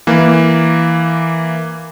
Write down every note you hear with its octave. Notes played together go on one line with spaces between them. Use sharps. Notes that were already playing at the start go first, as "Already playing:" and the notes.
E3 A#3